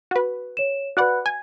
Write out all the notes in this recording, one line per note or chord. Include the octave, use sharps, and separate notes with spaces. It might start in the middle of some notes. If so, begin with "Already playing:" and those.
F#4 B4
C#5 E7
F#4 B4 D5 F#5 B5 F#6
G#5 G#6